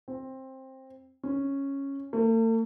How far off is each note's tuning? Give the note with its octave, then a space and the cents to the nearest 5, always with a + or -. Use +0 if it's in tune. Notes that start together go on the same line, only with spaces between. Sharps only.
C4 +15
C#4 -5
A3 +45